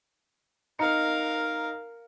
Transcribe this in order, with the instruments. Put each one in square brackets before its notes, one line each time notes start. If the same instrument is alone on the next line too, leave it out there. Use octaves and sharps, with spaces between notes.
[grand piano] D#4 A#5 C#7 [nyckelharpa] A#4 F5